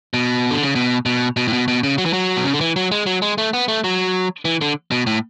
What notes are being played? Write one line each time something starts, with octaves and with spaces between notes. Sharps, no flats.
B2
D3
C#3
B2
B2
B2
A2
B2
B2
C#3
F#3
E3
F#3
B2
C#3
D3
E3
F#3
G#3
F#3
G#3
A3
B3
A3
F#3
E3
D3
B2
A2